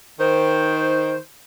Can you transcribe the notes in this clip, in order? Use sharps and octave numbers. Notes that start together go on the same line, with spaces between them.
D#3 C5